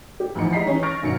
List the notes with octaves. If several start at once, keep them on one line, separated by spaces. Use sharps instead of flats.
G4
E2 A2 F3 D#4 B5 C#7
G3 G#3 D#5 A#5 B6 C7
D#3 E3 C#4 D#4
C#6 F6 A6 A#6 D7
G#1 F#2 B2 C#7